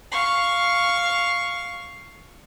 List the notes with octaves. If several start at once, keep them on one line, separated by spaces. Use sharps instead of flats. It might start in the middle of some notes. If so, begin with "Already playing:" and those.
F5 C#6